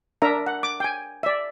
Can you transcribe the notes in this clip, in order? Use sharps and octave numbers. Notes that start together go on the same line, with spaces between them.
D4 A#4 E5 A#5
F#5
D6
G5 G#5
D5 E5